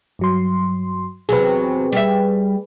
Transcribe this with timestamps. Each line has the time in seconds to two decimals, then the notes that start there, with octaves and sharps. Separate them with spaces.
0.19 G2 F#3 C6
1.29 E2 C3 F#3 G#4 B4
1.92 G3 E5